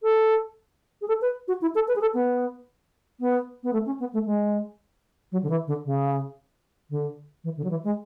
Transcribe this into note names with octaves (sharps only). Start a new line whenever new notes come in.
A4
G#4
A4
B4
F#4
E4
A4
B4
G#4
A4
B3
B3
B3
A3
C#4
B3
A3
G#3
F#3
D3
E3
D3
C#3
D3
E3
D3
F#3
E3
G#3